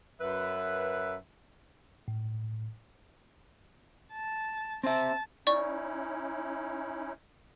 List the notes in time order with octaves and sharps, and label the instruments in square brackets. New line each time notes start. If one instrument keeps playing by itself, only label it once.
[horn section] F#2 B4 E5
[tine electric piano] A2
[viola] A5
[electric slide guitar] C4 C5 E5 [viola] A5
[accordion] C#4 D#4 E4 [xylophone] D5 C#6